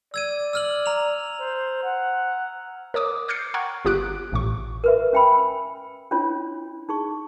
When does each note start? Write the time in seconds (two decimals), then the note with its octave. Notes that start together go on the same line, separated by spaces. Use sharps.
0.14 D5 E6 G#6 D#7
0.53 E6 F6 F#7
0.86 A#5 F7
1.40 C5
1.84 F#5
2.94 A#4 C#5 D6 D#6
3.28 D6 F6 G6 A6 C7 C#7
3.54 F#5 G5 A#5 C#6 F6 G#6
3.85 G1 F4 G4 D6 F#6 D7
4.32 A1 A2 C#6
4.84 A#4 B4 E5
5.13 C#4 E5 G5 G#5 B5 E6
6.11 C#4 D4 E4 F4 C#5
6.89 D#4 G#4 C#6